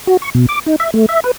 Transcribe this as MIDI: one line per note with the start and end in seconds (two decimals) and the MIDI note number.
0.07 0.17 66
0.22 0.30 85
0.35 0.46 47
0.49 0.59 86
0.66 0.76 63
0.80 0.91 76
0.94 1.06 57
1.09 1.20 76
1.24 1.31 71